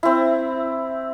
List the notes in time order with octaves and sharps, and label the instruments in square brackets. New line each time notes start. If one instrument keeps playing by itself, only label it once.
[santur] C4 E4